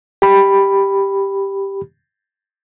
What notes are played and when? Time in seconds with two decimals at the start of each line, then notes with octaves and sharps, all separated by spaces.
0.22 G4 B5